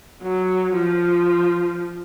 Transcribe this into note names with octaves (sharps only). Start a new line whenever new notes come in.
F#3
F3